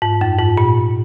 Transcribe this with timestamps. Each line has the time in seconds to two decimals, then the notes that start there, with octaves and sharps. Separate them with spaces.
0.02 G#2
0.21 F#2
0.39 G#2
0.57 A#2